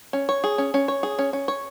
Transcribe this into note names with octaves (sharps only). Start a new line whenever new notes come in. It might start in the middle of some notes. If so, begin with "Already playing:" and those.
C#4
C#5
G#4
C#4
C#4
C#5
G#4
C#4
C#4
C#5